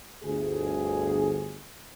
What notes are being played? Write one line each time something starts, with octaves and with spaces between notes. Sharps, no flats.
G1 D2 G#4